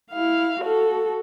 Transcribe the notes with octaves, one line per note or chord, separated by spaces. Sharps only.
E4 F5
F#4 A4